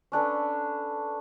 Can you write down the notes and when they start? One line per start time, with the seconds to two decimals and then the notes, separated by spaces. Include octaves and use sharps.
0.12 C#4 D4 A4 B4